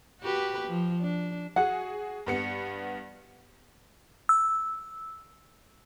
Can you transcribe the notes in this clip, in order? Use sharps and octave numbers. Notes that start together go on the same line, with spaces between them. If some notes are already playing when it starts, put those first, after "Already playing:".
F#4 G4 B4
F3
D4
F#4 G#4 F#5
G2 B3 C#7
E6